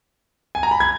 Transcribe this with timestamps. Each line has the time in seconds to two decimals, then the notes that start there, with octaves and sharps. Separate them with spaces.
0.55 G#5
0.63 A#5
0.71 B5
0.80 G#6